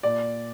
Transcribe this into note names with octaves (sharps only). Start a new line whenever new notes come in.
A#2 D5